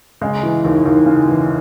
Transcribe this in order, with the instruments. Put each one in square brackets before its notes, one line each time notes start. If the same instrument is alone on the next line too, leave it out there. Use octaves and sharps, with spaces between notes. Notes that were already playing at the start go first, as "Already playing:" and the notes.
[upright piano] C#3 G#3
E3
D#2
D#2
C#3
E3